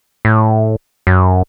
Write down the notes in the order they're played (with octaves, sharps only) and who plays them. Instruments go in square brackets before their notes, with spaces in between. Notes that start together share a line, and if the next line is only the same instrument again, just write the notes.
[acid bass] A2
F#2